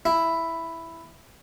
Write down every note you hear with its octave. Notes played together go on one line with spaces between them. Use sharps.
E4